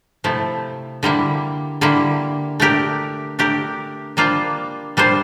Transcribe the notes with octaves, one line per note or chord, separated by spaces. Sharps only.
C3 F3 A3 E4
D3 G3 A#3 E4
D3 G3 A#3 E4
A3 D4 G4 A#4
A3 D4 G4 A#4
G3 A#3 D4 F4 C5
G3 A#3 D4 F4 C5